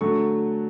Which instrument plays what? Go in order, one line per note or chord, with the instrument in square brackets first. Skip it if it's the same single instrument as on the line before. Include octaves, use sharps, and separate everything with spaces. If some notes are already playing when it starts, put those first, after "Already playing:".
[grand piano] D3 F#3 A3 C#6